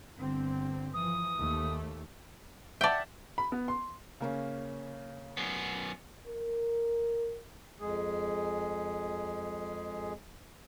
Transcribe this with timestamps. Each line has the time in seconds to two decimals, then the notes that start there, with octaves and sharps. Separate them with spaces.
0.17 G1 D3 C4
0.94 E3 F3 D#6
1.38 D#2 A3
2.81 D5 E5 F#5 G5 A5
3.38 B5
3.52 B3
3.68 C6
4.20 C#3 A#3 C#4
5.37 F#2 B3
6.28 A#4
7.81 F2 G#3 G#4